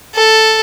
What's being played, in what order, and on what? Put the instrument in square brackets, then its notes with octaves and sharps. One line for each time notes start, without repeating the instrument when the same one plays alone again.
[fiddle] A4